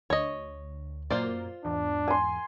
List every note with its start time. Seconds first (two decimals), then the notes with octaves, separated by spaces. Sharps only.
0.10 D2 C#5 D#5
1.10 F#2 A#2 A#3 F4 C5 D5
1.65 E2 G#2 D4
2.08 G#5 C6